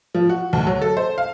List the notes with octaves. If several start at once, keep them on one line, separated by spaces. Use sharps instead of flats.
F3
F#4
D2
F#3
A4
C5
F5